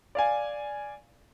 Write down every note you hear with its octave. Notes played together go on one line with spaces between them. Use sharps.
D5 F5 G#5